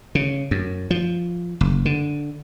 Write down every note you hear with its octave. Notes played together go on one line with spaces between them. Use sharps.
C#3
F#2
F3
F#1
D3